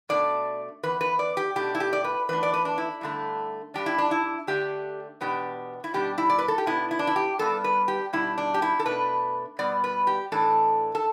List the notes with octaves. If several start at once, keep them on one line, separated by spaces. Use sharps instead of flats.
B2 A3 D4 D5
E2 E3 B4
B4
D5
G4
B2 A3 D4 G4
E4
G4
D5
B4
E2 E3 A3 D4 B4
D5
B4
D4
E4
G2 D3 A3
G2 G3 D4 G4
E4
D4
E4
D3 A3 D4 G4
E2 B2 B3 D4 G4
E4
B2 G3 D4 G4
E4
D5
B4
A4
G4
B2 B3 D4 E4
E4
D4
E4
G4
G2 G3 B3 D4 A4
B4
G4
B2 G3 D4 E4
D4
G4
E4
A4
B2 A3 D4 B4
B2 G3 B3 D5
B4
G4
A2 E3 A3 D4 A4
A4